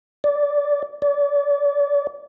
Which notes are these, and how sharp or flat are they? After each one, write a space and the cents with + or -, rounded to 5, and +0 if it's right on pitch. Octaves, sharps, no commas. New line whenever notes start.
D5 -15
D5 -35